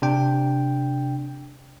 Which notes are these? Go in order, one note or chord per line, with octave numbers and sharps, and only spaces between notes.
C3 D4 G5